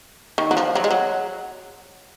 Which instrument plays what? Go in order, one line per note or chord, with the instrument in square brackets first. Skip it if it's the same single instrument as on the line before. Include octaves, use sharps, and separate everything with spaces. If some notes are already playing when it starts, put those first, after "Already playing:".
[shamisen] D#3
F#3
F3
F#3
G#3
F#3